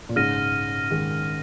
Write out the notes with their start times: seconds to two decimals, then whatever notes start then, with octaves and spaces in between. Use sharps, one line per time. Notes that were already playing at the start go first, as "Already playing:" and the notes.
0.09 A#2
0.16 G#2 C#3 F6 A#6 D#7
0.91 D#3 G#3